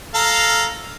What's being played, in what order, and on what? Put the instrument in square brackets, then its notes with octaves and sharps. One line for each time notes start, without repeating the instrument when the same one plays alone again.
[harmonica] A4 F5 A#5